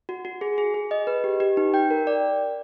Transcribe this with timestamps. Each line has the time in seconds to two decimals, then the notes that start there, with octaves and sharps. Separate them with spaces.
0.09 F#4
0.25 F#4
0.41 G#4
0.58 G#4
0.74 G#4
0.91 D#5
1.07 B4
1.24 G4
1.40 G4
1.57 D#4
1.74 G5
1.91 A#4
2.07 D5